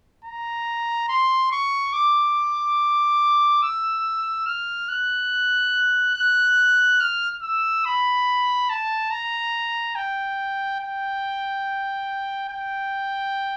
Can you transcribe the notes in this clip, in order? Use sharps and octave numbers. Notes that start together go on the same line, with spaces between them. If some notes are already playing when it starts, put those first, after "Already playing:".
A#5
C6
C#6
D6
E6
F6
F#6
F#6
F6
E6
B5
A5
A#5
G5
G5
G5